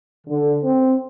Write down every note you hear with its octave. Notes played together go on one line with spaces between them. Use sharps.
D3
C4